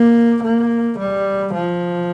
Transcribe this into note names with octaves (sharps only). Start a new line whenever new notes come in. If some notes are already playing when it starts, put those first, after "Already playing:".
Already playing: A#3
A#3
G3
F3